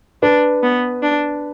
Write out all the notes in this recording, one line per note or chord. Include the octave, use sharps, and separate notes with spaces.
D4 B4
B3
D4